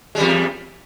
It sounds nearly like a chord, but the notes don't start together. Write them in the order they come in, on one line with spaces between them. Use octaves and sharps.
G#3 G3 E2